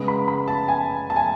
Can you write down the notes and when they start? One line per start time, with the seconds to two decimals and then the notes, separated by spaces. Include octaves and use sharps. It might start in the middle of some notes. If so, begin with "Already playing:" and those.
Already playing: C#3 G#3 B3
0.08 B5
0.28 B5
0.48 A5
0.68 G#5
1.10 A5
1.16 G#5